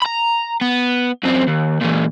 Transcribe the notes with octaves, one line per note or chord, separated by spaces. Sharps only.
A#5 B5
B3
F#2 C4
D#2
A#2 E3